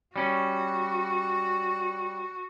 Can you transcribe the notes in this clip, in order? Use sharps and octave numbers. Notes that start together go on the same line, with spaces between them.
G3 C#4 F#4